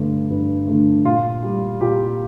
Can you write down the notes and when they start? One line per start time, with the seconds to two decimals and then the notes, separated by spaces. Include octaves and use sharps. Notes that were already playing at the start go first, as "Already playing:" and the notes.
Already playing: G2 D3 A3
0.30 G2
0.67 D3 A3
1.05 A#2 F4
1.43 G3
1.81 A#2 G4